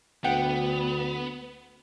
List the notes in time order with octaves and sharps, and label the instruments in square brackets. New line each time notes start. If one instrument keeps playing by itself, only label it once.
[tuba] D2 [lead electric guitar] B3 [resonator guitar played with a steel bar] F#5 G5